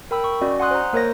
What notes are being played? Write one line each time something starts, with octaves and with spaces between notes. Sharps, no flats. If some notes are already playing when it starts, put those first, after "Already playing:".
A#4 G5 B5 E6
C#6
C#4 F#4 D5 D#5
F#5 G#5 C6 D#6 F#6
C5 A#5
A#3 A#4 C5 C#5 D#5 A#6